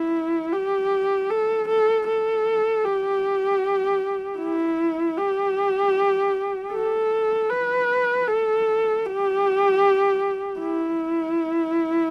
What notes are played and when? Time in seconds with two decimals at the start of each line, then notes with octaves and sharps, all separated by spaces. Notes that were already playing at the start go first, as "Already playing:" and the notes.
Already playing: E4
0.53 G4
1.30 A4
1.69 A4
2.07 A4
2.84 G4
4.39 E4
5.17 G4
6.72 A4
7.50 B4
8.28 A4
9.05 G4
10.59 E4